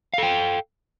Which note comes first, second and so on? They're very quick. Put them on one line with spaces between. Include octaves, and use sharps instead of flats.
F5 A4 G5